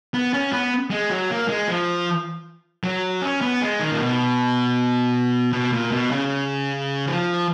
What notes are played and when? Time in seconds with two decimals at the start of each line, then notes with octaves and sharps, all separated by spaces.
0.14 B3
0.34 C#4
0.52 B3
0.91 G#3
1.10 F#3
1.30 A#3
1.48 G#3
1.68 F3
2.84 F#3
3.22 C#4
3.41 B3
3.61 G#3
3.79 D#3
3.92 A#2
3.99 B2
5.53 B2
5.73 A#2
5.92 B2
6.11 C#3
7.07 F3